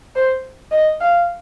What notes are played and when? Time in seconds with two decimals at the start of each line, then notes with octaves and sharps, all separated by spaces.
0.16 C5
0.72 D#5
1.00 F5